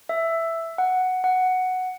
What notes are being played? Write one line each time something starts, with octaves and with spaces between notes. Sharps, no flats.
E5
F#5
F#5